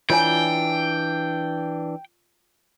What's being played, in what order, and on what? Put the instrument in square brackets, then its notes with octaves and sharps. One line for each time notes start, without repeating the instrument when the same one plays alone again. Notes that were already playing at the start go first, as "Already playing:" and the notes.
[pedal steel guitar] E3 D4 [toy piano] F4 C#5 G#5 [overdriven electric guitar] G5